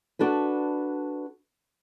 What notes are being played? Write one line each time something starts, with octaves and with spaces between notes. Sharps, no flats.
D4 F#4 A4 B4